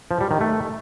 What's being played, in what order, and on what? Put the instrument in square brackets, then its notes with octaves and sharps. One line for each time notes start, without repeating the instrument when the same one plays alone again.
[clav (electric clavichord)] F3
G3
D#3
A3